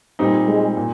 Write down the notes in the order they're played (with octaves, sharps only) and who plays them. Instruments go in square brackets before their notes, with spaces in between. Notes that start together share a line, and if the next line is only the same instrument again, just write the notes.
[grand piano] A#2 G3 C4 D#4
[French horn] G#3
[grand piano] A#2